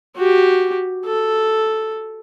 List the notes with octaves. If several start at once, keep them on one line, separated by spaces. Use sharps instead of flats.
F#4 G4
A4